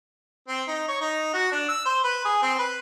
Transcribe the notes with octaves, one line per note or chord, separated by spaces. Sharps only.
C4
D#4
C#5
D#4
F#4
D4
E6
C5
B4
G#4
C4
B4